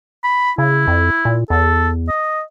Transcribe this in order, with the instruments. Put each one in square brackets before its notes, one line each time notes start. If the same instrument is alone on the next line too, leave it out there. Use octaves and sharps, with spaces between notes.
[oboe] B5
[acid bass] C#3 [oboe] E4
[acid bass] F2
A#2
[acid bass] E2 [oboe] A4
[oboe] D#5